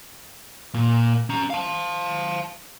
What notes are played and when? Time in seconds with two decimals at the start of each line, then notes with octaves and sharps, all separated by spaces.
0.74 A#2
1.30 C#4 A#5
1.50 F5 A5